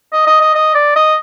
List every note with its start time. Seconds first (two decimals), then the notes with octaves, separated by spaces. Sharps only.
0.13 D#5
0.27 D#5
0.41 D#5
0.55 D#5
0.75 D5
0.96 D#5